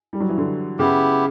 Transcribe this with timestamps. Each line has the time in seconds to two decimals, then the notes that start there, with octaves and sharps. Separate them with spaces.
0.13 G3
0.20 F#3
0.29 E3
0.38 D3
0.79 C#3 B3 E4 G4